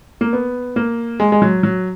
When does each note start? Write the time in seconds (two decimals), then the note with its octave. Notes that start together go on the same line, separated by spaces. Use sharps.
0.21 A#3
0.33 B3
0.76 A#3
1.20 G#3
1.32 G#3
1.42 F#3
1.63 F#3